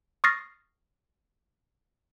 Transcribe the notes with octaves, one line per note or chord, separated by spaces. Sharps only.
C#6 D#6 F6 A6 A#6 C7